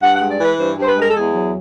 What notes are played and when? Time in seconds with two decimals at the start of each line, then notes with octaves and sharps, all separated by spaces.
0.03 G2 F#5
0.16 F#5
0.21 G#3
0.31 D5
0.41 E3 B4
0.59 G2 C5
0.78 G2 C5
0.87 B4
0.96 G#3 A#4
1.10 A4
1.15 E2 G#4
1.33 F#3